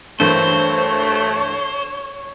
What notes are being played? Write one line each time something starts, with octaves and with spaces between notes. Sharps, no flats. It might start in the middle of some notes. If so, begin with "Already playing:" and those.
G2 E3 A3 A#3 C5 C#5